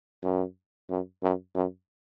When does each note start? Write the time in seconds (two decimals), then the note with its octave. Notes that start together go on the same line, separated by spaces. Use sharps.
0.23 F#2
0.90 F#2
1.23 F#2
1.55 F#2